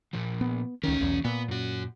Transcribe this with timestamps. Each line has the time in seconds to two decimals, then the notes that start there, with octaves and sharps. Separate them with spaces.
0.13 A#2 F3
0.41 B3
0.83 C#2 D#3 E3 C#4
1.01 B1 E2
1.25 A#2 B3
1.48 F#2 F#4